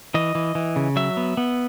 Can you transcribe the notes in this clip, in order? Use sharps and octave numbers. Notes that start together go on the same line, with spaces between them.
E3 D#5
E3
E3
C#3
F#3 E5
B3
B3